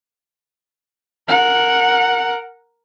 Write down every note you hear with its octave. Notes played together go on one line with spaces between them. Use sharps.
A#4 F#5